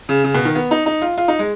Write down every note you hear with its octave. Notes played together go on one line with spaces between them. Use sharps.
C#3
C#3
B2
D#3
B3
D#4
D#4
F4
F4
D#4
G#3